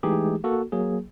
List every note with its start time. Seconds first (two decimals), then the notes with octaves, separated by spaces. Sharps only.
0.03 E3 G#3 A3 D#4 G4 G#4
0.44 A#3 F#4 A4
0.72 F#3 A#3 G#4